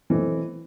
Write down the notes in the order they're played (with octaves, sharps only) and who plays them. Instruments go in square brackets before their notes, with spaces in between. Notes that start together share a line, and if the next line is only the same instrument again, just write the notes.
[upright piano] B2 F#3 A3 C4 [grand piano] E3